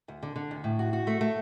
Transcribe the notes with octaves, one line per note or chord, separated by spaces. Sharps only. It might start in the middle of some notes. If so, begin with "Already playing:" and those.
D2
D3
D3
D2
A2
F#4
F#4
A3
A3